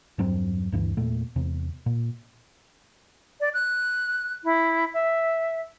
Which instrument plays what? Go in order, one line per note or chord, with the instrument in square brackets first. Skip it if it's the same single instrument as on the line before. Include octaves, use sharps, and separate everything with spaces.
[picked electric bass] E2 G2 F#3 C4
D2 G2 E3
E2 A#2 A3
E2 C3
A#2
[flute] D5
F#6
E4
E5